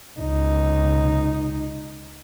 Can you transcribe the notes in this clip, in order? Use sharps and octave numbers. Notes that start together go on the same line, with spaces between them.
C#2 D#4